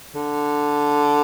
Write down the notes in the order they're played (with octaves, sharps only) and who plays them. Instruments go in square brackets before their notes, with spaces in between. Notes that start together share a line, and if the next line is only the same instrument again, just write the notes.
[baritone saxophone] D3